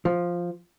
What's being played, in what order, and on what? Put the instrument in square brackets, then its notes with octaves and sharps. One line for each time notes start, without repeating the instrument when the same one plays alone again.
[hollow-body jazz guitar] F3